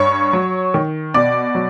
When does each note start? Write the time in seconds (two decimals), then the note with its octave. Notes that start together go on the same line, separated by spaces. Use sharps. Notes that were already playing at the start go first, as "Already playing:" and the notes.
Already playing: G2 C#5 C#6
0.33 F#3
0.74 D#3
1.14 B2 D5 D6
1.55 F#3